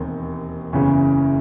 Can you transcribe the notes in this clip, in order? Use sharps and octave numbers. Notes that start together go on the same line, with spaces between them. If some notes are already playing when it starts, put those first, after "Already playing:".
Already playing: E1 D#2 D#3 C4
F#1 E2 C#3 E3 C#4